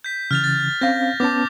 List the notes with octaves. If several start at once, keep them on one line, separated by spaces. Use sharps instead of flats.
G6 B6
C#3 E3 F6 A6 F7
A6
C4 C#4 F5 G6 A#6
B3 C#4 A5 D6 G6